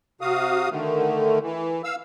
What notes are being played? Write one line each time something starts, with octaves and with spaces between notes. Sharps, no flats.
C3 F#4 F5 D#6
D3 D#3 A3
E3
F5 E6